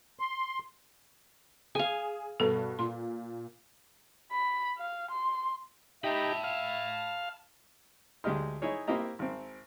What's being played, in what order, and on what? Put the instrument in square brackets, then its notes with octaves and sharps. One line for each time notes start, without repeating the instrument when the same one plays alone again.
[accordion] C6
[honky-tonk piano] G#4 [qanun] F5 G#5
[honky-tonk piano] G2 B2 B3 [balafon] A4
[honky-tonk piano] A#2 [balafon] C6
[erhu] B5
F5
C6
[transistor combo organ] D#4 G4 [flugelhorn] E5 [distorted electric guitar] A5 B5
[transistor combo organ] F5
[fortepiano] D2 G#3 G4 D#5 F6
D#4 E4 G#4 C#5
A#3 C4 E4 G4 D#5 A#5
G#1 C4